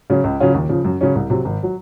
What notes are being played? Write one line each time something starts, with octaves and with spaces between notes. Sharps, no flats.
C#3 F#3 C#4
C#2
C#3 F#3 C#4 F4
D#2
C#3 F3
F#2
C#3 F#3 C#4
C2
C3 F#3
G#1
F#3